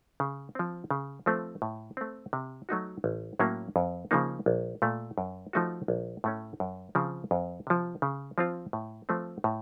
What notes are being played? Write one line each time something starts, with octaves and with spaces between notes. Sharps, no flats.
C#3
F3 C4
C#3
F3 A3 C4
A2
A3 C4
C3
F#3 A3 D#4 F#4
A1
A2 F#3 A#3 C#4
F2
C#3 F3 A#3 D#4
A#1
A#2 A3
F#2
F3 A3 D#4 F#4
A#1
A2 A3 C#4
F#2
C#3 F3 C4
F2
C3 F3
C#3
F3 C4 F4
A2
F3 A3 C4
A2